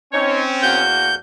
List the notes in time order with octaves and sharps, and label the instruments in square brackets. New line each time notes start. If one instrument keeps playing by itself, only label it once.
[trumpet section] C4 C#4 [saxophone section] D#4 C#5
[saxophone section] E2 A#3 F#4 [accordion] G6